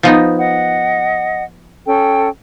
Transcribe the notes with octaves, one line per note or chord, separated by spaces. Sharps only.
F3 B3 D#4
D#5 F#5
C#4 A4 G5